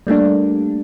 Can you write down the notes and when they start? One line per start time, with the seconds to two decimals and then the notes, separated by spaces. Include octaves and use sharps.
0.07 G3 A3 A#3 D4